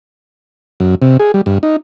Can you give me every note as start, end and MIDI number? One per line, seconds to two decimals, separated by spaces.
0.80 0.95 42
1.02 1.17 48
1.19 1.32 68
1.34 1.41 55
1.46 1.58 43
1.63 1.76 63